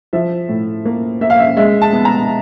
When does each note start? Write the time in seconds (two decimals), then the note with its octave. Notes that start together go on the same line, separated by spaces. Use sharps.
0.13 F3 E5
0.49 A2
0.85 A#3
1.21 A#3 E5
1.30 F5
1.39 E5
1.57 G#3 E5
1.81 A5
1.93 B3
2.05 A#5